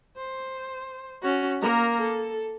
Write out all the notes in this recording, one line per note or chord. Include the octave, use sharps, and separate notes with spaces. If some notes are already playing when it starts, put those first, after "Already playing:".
C5
C#4 F#4
A#3 A#4
A4